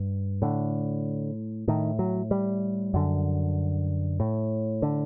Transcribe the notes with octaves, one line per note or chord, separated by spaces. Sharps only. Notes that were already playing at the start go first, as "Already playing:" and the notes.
Already playing: G2
A2 D3
A2 D#3
F#3
G3
F#2 D3
A2
D3